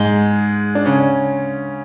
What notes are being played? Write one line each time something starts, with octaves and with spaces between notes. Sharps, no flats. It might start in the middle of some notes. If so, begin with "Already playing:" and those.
Already playing: G#2 G#3
D4
C#3 C#4